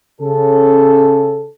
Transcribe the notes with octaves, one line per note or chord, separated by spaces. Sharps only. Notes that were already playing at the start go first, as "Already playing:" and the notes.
C#3 A4